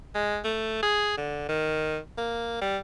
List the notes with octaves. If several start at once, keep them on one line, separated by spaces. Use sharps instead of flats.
G#3
A3
G#4
D3
D#3
A#3
G3